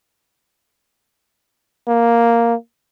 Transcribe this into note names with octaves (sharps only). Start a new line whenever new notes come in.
A#3